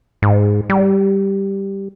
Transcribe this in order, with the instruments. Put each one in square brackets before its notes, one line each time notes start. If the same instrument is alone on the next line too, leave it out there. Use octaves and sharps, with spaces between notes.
[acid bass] G#2
G3